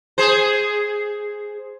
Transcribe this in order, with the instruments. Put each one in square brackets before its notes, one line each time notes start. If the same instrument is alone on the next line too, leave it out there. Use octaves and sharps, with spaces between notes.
[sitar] G#4 C5